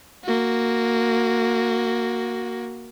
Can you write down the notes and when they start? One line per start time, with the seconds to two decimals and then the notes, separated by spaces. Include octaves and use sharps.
0.24 A#3 F#4